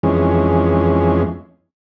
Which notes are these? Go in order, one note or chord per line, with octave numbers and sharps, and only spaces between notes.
F2 E3 G#3 C#4